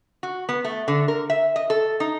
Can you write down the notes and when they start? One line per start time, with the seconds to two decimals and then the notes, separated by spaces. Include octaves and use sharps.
0.23 F#4
0.49 B3
0.65 A3
0.88 D3
1.08 A#4
1.30 E5
1.56 D#5
1.70 A4
2.00 D#4